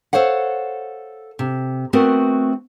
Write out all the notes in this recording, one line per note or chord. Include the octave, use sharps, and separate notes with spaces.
A4 C5 C#5 F5 F#5
C3
A3 B3 C4 F#4 A#4